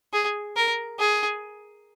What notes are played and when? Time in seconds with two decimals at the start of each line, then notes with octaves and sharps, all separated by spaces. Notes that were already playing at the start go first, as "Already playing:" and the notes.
0.13 G#4
0.57 A#4
0.99 G#4